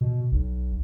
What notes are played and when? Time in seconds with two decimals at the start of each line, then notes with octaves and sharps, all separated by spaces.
0.01 B2
0.32 B1